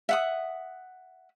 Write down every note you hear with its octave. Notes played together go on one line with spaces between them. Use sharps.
E5 F#5 D#6